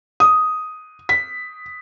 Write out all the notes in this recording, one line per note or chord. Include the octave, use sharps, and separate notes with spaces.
D#6
B6